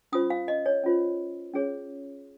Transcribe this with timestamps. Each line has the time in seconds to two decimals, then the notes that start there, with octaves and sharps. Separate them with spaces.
0.12 C#4 F4 C5 D#6
0.30 F5
0.48 D#5
0.66 C#5
0.84 C#4 F4 C5
1.54 C#4 G#4 C#5